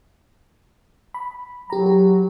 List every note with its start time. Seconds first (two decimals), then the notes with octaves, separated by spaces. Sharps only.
1.14 B5
1.70 F#3 G4 A#5
1.86 G4